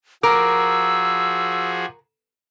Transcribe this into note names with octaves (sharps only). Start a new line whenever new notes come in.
F3 F#4 G#4 A#4 D6 E6